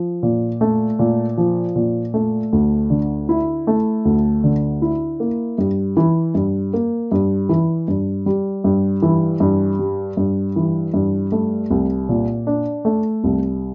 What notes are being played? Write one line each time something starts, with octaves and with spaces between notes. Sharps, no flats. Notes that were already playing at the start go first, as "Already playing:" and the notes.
Already playing: F3
A#2
A3
A#2
F3
A#2
A3
D2
D3
E4
A3
D2
D3
E4
A#3
G2
E3
G2
A#3
G2
E3
G2
G3
G2
E3
G2
G3
G2
E3
G2
A3
C2
A#2
D4
A3
C2